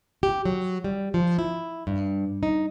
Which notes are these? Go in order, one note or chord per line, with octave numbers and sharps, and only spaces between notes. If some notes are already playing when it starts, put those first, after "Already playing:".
G4
F#3
G3
F3
E4
G2
D#4